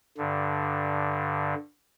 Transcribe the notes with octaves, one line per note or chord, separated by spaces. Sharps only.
G2 D3